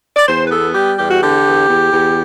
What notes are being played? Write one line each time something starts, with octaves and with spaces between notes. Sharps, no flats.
D5
E2 C5
B4
B3 A4
G3 G4
E2 G4
F#4
D3 G4
E2
E2
E2